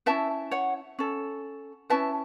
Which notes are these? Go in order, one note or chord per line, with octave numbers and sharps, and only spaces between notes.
C#4 E4 B4 E5 A5
C#5 F#5
C#4 A4
C#4 E4 B4 E5 A5